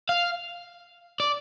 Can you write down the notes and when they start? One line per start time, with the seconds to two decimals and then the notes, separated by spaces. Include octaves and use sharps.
0.09 F5
1.20 D5